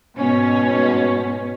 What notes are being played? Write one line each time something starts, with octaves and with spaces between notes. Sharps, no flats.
G#2 B2 C#4